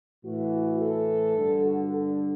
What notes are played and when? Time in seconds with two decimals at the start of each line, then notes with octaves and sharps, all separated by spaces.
0.24 A2 E3 F#4
0.81 A4
1.37 G2 D3
1.65 F#4
1.93 A4